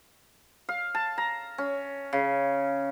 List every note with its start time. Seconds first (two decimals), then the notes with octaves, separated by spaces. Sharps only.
0.69 F5
0.95 A5
1.18 A#5
1.58 C#4
2.13 C#3